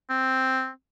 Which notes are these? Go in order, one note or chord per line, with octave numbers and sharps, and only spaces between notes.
C4